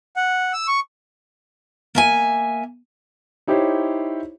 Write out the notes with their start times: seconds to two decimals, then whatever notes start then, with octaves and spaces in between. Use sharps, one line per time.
0.16 F#5
0.53 E6
0.68 C#6
1.95 A#3 E5 G#5
3.47 D#4 E4 G4 C5 C#5